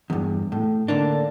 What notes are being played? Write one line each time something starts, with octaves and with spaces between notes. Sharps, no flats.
E2 G2
A2
D3 A#3 D4